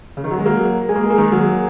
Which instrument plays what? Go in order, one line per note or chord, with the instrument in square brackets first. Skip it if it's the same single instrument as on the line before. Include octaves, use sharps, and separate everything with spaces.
[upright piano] C#3
D#3
F#3
G#3
F#3 A#3
[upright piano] G#3 [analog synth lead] G#4
[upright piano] A#3
G#3
A#3
D#3 G#3
F#3 A#3